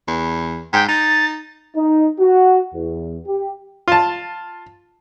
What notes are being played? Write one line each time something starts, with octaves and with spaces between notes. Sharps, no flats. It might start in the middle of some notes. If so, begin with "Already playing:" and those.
E2
G#2 G5
D#4 A6
D#4
F#4
E2
G4
F4 A5